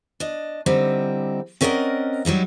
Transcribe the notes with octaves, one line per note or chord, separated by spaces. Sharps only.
D4 D#5
D3 G3 C4 D#4 E4
C4 C#4 A#4 D5 D#5 F#5
F#3 G3 D#4 E4